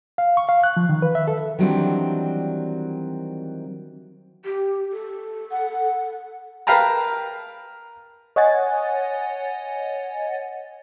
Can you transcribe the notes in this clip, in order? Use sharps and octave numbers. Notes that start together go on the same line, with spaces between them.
F5
C#6
F5
F#6
F3
D#3
B4
E5
A4
D#3 E3 F#3 G3 C4 D4
G4
A4
F#5
A#4 B4 F5 G5 A5 A#5
C#5 D#5 F#5 G#5 A6